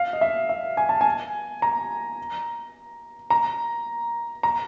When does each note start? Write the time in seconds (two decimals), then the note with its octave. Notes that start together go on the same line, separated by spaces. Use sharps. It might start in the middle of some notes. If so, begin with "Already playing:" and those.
Already playing: F5
0.13 D#5
0.21 E5
0.49 E5
0.77 G#5
0.89 A5
1.01 G#5
1.62 A#5
3.30 A#5
4.43 A#5